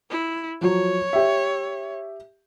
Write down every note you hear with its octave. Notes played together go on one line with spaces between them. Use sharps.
E4
F3 F#3 C#5
G4 E5